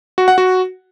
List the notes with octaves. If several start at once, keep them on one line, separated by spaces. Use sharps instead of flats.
F#4
F#5
F#4